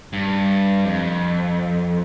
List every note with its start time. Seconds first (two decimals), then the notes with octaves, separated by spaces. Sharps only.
0.13 G2
0.85 F2